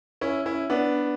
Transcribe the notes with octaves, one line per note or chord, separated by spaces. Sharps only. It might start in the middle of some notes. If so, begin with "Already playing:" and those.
C#4 E4
C#4 E4
B3 D4